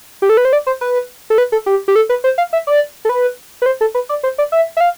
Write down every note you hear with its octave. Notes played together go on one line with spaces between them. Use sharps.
G4
A4
B4
C5
D5
C5
B4
A4
B4
A4
G4
G4
A4
B4
C5
F5
E5
D5
A4
B4
B4
C5
A4
B4
D5
C5
D5
E5
E5
F5